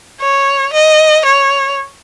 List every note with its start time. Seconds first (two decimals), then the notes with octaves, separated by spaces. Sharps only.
0.20 C#5
0.73 D#5
1.25 C#5